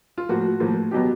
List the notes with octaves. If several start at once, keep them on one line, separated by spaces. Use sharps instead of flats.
F4
A2 F3 A#3 F#4
A2 F3 A#3
B2 F#3 B3 G4